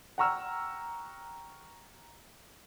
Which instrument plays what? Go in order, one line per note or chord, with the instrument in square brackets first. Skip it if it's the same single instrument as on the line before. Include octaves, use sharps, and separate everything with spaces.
[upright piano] F#5 G5 A#5 C#6 E6 F6